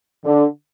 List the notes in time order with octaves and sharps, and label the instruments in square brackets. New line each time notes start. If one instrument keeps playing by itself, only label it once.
[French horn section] D3